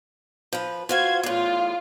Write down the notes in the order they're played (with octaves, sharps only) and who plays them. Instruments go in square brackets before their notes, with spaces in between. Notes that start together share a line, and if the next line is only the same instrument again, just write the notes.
[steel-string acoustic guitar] F3 B4
[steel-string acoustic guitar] F4 F#4 F5 [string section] C5 G#6
[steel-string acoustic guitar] E2 A2 [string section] F4